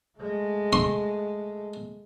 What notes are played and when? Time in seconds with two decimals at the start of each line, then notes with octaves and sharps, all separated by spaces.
0.18 G#3 A3
0.73 C6